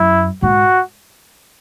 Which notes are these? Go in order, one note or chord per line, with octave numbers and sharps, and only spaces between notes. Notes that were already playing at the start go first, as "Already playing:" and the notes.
Already playing: F#2 E4
G#2 F#4